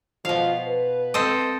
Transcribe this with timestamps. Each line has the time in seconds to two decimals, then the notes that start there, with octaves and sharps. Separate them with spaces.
0.25 B2 F3 F5
0.67 B4
1.14 C4 A4 D#5